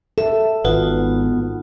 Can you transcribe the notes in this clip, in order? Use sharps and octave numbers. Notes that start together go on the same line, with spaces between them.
A4 E5
G#1 B3 D#4 F4 F#4